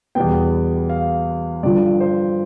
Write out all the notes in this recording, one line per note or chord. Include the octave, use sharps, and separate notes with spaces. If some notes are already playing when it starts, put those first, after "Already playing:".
E2 B2 G3 B3 G5
F5
G2 D3 F3 D5
C5